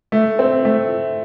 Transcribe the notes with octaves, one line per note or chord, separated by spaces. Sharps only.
A3
C4
A3